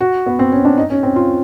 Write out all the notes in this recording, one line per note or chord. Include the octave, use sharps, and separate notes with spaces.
F#4
B3
C4
C#4
D4
D#4
C#4
C4
F4